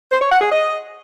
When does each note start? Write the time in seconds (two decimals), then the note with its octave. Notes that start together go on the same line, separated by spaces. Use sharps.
0.11 C5
0.21 C#5
0.31 F#5
0.41 G#4
0.51 D#5